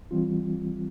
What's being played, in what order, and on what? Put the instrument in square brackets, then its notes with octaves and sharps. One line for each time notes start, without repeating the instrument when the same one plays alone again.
[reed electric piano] E3 G3 C4 F4